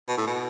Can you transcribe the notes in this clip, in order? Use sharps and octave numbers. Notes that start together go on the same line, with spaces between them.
B2
A2
B2